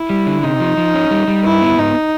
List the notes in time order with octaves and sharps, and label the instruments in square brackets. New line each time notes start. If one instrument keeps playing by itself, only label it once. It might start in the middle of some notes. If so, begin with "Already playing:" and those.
Already playing: [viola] E4
[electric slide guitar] G3
D3
[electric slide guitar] C3 [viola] D#4
[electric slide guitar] F3
F3
C#4
G3
G3
[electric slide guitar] G2 [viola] E4
[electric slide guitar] B3
[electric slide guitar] G#2 [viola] D#4